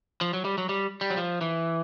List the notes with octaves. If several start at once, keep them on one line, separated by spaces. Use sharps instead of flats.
F3
F#3
G3
F#3
G3
G3
F#3
F3
E3